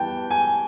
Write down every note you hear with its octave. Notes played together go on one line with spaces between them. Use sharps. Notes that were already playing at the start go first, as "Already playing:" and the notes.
Already playing: E3 G3 B3 G5 A5
G#5